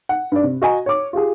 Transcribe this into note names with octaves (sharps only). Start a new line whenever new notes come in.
F#5
G2 D5
C3
F#4 D#5 G#5 A#5
C#5 D6
F4 G4 G#4